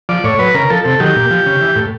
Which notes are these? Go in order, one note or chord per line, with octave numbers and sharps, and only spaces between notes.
F3 D5
A2 C#5
F#3 B4
C#3 A#4
F3 A4
C3 A4
D#3 F#3 G4
A#2
F3
C#3
E3
A2